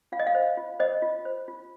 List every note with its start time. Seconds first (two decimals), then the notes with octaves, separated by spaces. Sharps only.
0.12 F4 F5
0.19 D#5
0.27 F5
0.35 C5
0.57 F4
0.80 C5 D#5
1.02 F4
1.25 C5
1.48 F4